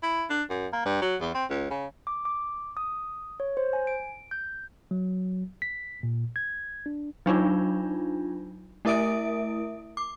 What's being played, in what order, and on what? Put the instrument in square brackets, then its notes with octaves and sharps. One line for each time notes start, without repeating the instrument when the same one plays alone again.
[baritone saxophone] E4
D4
F#2
A#3
G2
F#3
E2
C4
C#2
C#3
[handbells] D6
D6
D#6
C#5
C5
G#5
D7
G6
[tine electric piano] F#3
B6
A#2
G#6
D4
[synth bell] F#3 D4 D#4 F4
A3 E4 A#4 E5 D#6 D7
D6